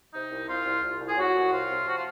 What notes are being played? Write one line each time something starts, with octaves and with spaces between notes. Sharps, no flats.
C3 D#4
C2
C2 F4
C2
C2 F4
C2
G#4
C2 F#3 F#4
C2
C3 F4
C3
F3 F#4
F4